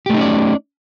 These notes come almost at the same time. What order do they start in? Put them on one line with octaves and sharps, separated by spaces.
G4 A3 D#4 C#4 D5